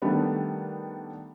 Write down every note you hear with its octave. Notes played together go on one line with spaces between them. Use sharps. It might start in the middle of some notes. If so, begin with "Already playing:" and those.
D#3 G3 A3 B3 D4